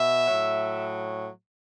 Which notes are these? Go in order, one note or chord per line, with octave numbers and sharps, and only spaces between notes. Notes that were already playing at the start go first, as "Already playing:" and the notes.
Already playing: B2 E5
A2 F#3